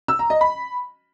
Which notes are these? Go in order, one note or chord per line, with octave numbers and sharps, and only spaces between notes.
E6
A#5
D#5
B5